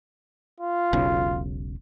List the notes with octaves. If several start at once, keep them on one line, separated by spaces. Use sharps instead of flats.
F4
E1 B1 C#3